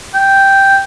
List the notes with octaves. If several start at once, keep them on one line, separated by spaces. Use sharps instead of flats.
G5